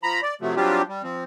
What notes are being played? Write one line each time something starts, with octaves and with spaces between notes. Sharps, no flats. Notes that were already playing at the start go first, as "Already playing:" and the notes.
F3 A#5 B5
D5
C3 F3 F#3 A3
F#3 G3 C4 D4 F4 G4
G3
F3 C4